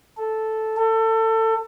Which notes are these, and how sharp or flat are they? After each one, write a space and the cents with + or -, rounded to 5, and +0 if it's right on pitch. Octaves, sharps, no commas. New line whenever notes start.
A4 -5
A4 +25